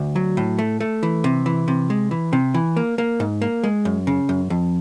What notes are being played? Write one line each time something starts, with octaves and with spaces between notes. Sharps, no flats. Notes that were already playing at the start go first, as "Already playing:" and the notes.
Already playing: D2
F#3
A2
A3
A3
E3
C3
E3
C3
G#3
E3
C3
E3
A#3
A#3
G#2
A#3
G#3
F#2
C#3
F#2
F2